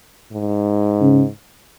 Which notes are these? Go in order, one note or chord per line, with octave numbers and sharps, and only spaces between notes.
G#2
C#3